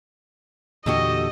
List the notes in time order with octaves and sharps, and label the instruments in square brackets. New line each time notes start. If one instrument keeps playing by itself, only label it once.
[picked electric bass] E2 A#2 D3 [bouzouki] F#4 G4 A4 [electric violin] D#5